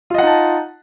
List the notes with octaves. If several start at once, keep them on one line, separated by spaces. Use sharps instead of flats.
D#4 F4 D#5 F#5 A5